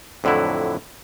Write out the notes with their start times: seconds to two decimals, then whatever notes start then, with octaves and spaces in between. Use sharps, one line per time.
0.24 F2 A2 D3 F#3 E4